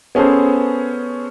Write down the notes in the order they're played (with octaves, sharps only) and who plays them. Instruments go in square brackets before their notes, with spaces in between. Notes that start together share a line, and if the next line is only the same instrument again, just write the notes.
[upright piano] B3 C#4 G#4 A4 C5